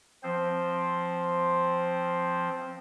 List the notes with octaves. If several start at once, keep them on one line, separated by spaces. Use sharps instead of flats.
F3 C4 C5